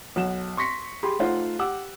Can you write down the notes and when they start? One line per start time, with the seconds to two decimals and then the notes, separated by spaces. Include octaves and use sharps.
0.16 B1 F#5 E7
0.57 C6 C#6 A#6 B6 C#7
1.03 G4 G#4 B5 C6
1.19 A3 D#4 F4 C5 F#5
1.59 G4 F#5 D6 E6